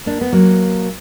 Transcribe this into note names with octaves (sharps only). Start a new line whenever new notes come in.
A#3 D4
B3
F#3 A#3